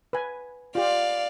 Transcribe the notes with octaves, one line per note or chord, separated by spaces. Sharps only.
B4 G#5
F4 G4 D5 F5